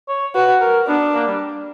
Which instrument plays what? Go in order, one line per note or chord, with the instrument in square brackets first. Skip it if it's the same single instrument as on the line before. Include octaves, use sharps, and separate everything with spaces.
[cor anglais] C#5
[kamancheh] F#4 [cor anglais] B4
[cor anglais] A#4
[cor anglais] B3 [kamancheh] D4
[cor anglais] A#3
G3